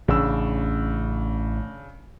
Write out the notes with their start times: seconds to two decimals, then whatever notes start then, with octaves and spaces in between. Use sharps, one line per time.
0.08 A1 C#3 D4 E6